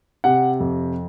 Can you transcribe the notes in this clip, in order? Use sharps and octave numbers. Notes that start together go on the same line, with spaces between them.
C3 F#5
F2